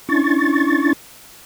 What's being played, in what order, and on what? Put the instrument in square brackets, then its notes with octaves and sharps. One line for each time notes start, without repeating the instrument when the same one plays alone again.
[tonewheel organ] C#4 D4 E4 C#6 A6